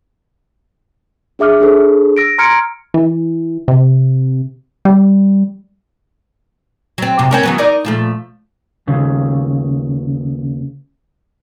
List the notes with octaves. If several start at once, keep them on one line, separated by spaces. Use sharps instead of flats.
D4 G#4 E5 D6 F6
D4 G#4 A4 C5
E6 A#6 D7
A#5 C6 F6 G#6 C#7 D7
E3
C3
G3
F#3 C4
F#2 C3
C4 C#4 A#4
E3 F#3 B3
D#4 A#4 D5
A#2 F3 A3
D#2 C#3